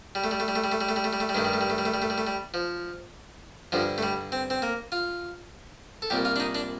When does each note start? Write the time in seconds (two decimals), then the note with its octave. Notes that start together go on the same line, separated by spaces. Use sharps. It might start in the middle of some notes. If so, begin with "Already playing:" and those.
0.15 G3
0.24 A3
0.31 G3
0.40 A3
0.48 G3
0.55 A3
0.64 G3
0.72 A3
0.81 G3
0.89 A3
0.96 G3
1.04 A3
1.13 G3
1.20 A3
1.29 G3
1.35 G2 D#3 A3
1.45 G3
1.53 A3
1.61 G3
1.70 A3
1.78 G3
1.85 A3
1.94 G3
2.02 A3
2.10 G3
2.18 A3
2.27 G3
2.54 F3
3.72 G2 D3 F3
3.98 A3
4.03 G3
4.32 C4
4.50 C4
4.62 A#3
4.92 F4
6.02 A4
6.10 C2 A#2 G4
6.25 F4
6.36 D4
6.40 D#4
6.55 D4